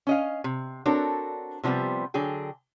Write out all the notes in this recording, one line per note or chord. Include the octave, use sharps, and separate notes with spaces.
C#4 D#5 F5
C3
C4 D4 F#4 A4 A#4 C#5
C3 F3 G3 B3 C4
D3 F#3 G#4 G5